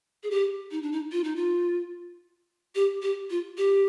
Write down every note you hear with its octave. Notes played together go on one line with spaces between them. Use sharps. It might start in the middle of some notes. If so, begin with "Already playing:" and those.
G#4
G4
D#4
D4
D#4
F4
D#4
F4
G4
G4
F4
G4